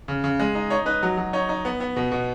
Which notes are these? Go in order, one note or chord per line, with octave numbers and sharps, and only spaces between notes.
C#3
C#3
G#3
D#4
D#4 C#5
D#4 B4
F#3
F#3
D#4 C#5
D#4
B3
B3
B2
B2